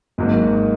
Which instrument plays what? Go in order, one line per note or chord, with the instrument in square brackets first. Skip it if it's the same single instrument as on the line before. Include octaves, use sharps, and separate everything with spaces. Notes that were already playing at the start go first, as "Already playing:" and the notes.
[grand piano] G#1 G#2 F#3 A#3